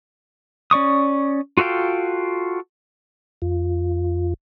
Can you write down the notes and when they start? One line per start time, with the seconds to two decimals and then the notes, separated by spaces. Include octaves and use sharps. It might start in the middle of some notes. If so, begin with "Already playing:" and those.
0.71 C#4 D5 C#6 D#6
1.57 F4 F#4 A4 F5 G5
3.42 F2 F4